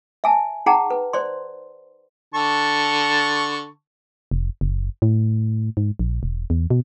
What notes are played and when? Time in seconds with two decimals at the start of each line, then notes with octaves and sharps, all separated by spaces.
0.24 E5 G#5 A5
0.66 D#4 G#4 F#5 G5 A5 A#5
0.90 B4
1.13 C5 D5 C6
2.34 D3 A5 C#6
4.31 F1
4.61 F#1
5.02 A2
5.77 G#2
5.99 A#1
6.23 E1
6.50 E2
6.70 B2